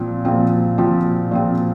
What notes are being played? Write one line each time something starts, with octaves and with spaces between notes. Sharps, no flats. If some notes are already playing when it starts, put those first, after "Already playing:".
Already playing: A#2 F3 C4
A#2 F3 C4
A#2 F3 C4
A#2 F3 C4